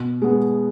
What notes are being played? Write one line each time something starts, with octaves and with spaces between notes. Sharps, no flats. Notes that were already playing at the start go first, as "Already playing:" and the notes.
Already playing: B2
G#3 B3